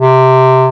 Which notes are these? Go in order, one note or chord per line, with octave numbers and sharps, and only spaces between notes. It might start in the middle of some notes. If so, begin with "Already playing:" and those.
C3